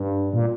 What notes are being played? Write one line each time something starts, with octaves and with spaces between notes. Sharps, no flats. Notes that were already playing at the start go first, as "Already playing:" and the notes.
Already playing: G2
A#2